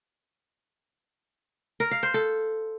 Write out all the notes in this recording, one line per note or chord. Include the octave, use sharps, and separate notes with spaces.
A#4
F5
C5
A4